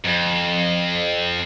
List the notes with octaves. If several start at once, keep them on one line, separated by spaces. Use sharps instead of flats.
F2